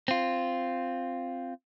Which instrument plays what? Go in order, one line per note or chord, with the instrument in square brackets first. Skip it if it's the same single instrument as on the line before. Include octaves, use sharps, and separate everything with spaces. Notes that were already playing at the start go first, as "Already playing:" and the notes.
[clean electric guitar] C4 F4